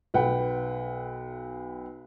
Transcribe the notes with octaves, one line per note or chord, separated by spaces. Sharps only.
B1 B4 F#5 G5